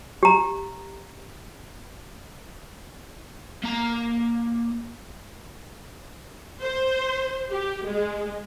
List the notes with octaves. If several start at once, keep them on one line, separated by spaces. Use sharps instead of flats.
G4 A#5
A#3 A#5
C5
G4
G#3